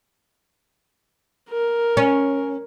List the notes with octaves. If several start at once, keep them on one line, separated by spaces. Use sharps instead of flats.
A#4
C#4